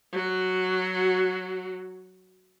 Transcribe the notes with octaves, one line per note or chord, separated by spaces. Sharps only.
F#3 F#4